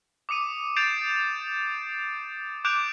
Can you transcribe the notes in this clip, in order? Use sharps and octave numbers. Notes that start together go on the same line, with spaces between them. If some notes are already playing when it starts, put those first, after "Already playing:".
D6 D#6 C#7 D#7
G6 A6 C7 D7 E7 F7
D6 F#6 G6 D7 E7 F7